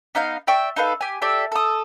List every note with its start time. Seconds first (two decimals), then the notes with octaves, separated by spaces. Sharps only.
0.15 B3 D#4 F5 G6
0.47 D5 E5 G5 C#6
0.76 D#4 A4 B4 F5
1.01 G4 G#5
1.22 G4 A4 D5 E5
1.52 A4 D#6